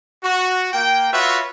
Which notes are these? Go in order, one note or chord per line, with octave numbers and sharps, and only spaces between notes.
F#4
A#3 G5
F4 F#4 B4 C#5 E5